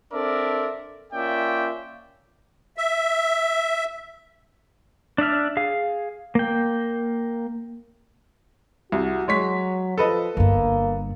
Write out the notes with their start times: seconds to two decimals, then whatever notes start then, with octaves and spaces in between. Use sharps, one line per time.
0.12 C4 D4 A4 A#4 D5 E5
1.13 A#3 C#4 F4 D5 E5 G5
2.77 E5
5.18 D4 D5 E5 F6
5.57 G#4 F5
6.35 A#3 G5
8.92 C2 F#4
9.28 F#3 G#3 C#5 B6
9.98 F3 A4 B4 D#5
10.37 G1 G2 A#3